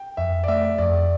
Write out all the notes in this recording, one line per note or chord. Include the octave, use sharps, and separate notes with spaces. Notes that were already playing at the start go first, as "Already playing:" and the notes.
Already playing: G5
F2 E5
D5
A3 E5
F2 D5